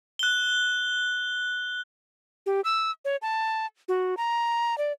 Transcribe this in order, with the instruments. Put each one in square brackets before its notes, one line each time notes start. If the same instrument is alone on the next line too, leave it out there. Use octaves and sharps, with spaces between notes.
[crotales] F#6 G7
[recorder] G4
E6
C#5
A5
F#4
A#5
D5